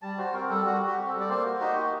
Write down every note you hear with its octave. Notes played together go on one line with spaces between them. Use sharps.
G3 A5
F#4 C5
C4 A#4
G3 A4
G3 F#4
F#4
G4
C4
A4
G3
D5
A#3 C5
F#4
D#4 G4
A#3